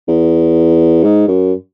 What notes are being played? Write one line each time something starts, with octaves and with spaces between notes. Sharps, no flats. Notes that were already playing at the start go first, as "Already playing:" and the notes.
E2
G#2
F#2